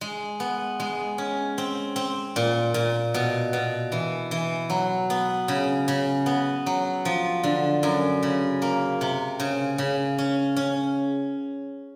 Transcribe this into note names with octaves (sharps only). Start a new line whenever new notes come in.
G#3
B3
G#3
C#4
C4
C4
A#2
A#2
B2
B2
E3
E3
F#3
B3
C#3
C#3
B3
F#3
F3
D3
F#2
C#3
A#3
C3
C#3
C#3
C#4
C#4